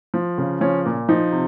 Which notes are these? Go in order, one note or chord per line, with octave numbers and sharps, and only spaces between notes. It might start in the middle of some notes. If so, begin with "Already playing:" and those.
F3
C#3
F3 C#4
A#2
F3 D#4
C3